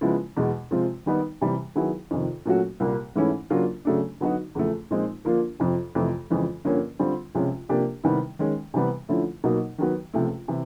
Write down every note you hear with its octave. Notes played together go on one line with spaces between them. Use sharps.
C#3 F3 G#3 B3 E4
E2 B2 G#3
C3 F3 G#3 C4 F4
D#3 G3 B3 D#4
C3 E3 G3
D#3 F#3 B3 E4 G#4
F2 C3 D#3
A#2 F#3 A3 C#4 F#4
C2 A#2 G3 A#3
G#2 E3 A3 C#4 E4
C#3 F#3 A#3 D4 F4
C#3 F#3 A3 D4
D3 F#3 B3 D#4 F#4
E2 C#3 F3 A3
A#2 F3 G#3 C4 D#4
D3 F3 A#3 D4 F4
F2 C3 F3
F2 C3 E3 A3
F2 C#3 E3 G#3
G2 D3 F3 A#3 C#4
D3 G3 C4 F4
C#2 C3 F3 G#3 C#4
C3 F3 A#3 D4 G4
C3 D#3 G3 B3 E4
D#3 G#3 C#4
C3 E3 G3 B3
D3 F3 A3 C#4 E4
B2 F#3 A#3 D#4
D#3 F#3 B3
C#2 C3 F3 A3
C3 E3